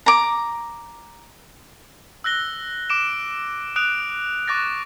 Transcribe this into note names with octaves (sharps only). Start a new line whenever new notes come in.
A#5 D6
E6 F#6 A#6 G7
D6 D7 E7
D#6 F#6 D7 F7
C#6 D6 F#6 A6 A#6